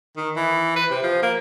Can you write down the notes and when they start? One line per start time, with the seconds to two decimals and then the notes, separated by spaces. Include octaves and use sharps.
0.17 D#3
0.36 E3
0.76 B4
0.91 C3
1.03 F3
1.23 A#3